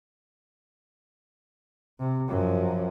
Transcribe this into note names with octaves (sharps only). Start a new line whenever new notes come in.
C3
F#2 F3